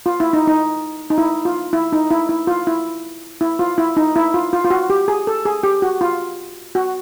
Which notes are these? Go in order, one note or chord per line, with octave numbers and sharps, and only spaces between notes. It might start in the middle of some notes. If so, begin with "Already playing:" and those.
F4
E4
D#4
D#4
D#4
E4
F4
E4
D#4
E4
E4
F4
E4
E4
F4
E4
D#4
E4
F4
F4
F4
F#4
G4
G#4
A4
G#4
G4
F#4
F4
F#4